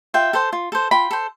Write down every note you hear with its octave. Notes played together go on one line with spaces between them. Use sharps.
F4 E5 G5
A4 C5
F4
A4 C5
F4 G5 B5
A4 C5